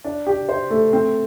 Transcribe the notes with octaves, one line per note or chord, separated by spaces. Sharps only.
D4
G4
C5
A3
C4